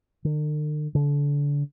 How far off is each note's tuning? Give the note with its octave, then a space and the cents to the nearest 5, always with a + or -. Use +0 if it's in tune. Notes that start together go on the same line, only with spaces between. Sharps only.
D3 +45
D3 -30